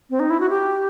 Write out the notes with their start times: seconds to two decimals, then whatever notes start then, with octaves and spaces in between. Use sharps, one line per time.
0.10 C4
0.20 D#4
0.30 E4
0.40 F#4
0.49 G4